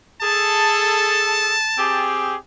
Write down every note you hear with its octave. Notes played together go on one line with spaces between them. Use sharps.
G#4 A4 A5
C4 G4 G#4